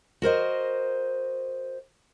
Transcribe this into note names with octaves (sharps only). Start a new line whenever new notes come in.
F#4 A#4 C5 D#5